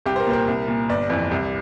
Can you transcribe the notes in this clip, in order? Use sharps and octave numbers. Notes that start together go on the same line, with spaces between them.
C2 G4
C5
A#4
A#2 C5
A#4
C2
A#2
G1 D5
F2 E3
C2